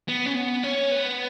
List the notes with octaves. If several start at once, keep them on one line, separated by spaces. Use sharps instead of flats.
B3
C#4
B3
C#4
B3